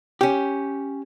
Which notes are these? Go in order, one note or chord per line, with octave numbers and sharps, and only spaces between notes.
C#4 G4